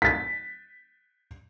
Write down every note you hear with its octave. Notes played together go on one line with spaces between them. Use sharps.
A6 B6